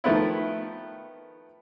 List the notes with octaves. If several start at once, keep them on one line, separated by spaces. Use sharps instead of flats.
D#3 F3 A3 B3 E4